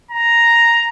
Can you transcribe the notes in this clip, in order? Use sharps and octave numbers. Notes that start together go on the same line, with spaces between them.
A#5